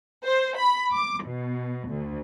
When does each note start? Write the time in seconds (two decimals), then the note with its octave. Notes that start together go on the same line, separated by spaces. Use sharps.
0.24 C5
0.57 B5
0.93 D6
1.24 B2
1.89 D2